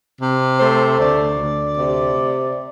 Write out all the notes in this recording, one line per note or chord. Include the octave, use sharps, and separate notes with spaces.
C3
A3 C5
D2 D5
D2
C3